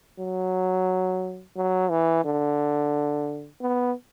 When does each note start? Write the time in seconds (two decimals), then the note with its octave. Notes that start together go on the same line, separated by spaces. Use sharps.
0.19 F#3
1.56 F#3
1.90 E3
2.25 D3
3.61 B3